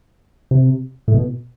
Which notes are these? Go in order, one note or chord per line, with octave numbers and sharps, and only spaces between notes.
C3
A2
B2